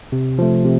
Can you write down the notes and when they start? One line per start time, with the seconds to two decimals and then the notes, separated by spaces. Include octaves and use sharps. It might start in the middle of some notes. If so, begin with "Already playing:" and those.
0.12 C3
0.39 F3 A3
0.64 C3